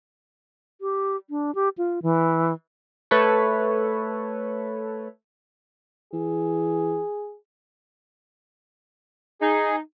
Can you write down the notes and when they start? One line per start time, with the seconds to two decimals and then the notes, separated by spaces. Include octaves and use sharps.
0.81 G4
1.30 D4
1.55 G4
1.78 F4
2.02 E3
3.11 A3 A4 B4 C#5
6.13 E3 G#4
9.42 D#4 G#4